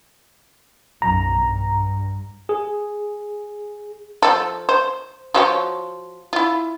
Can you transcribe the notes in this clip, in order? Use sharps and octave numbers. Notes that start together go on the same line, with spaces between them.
B1 F#2 A#5
G2
G#4
F3 A4
C5
F3 F#4 C#5
E4 F4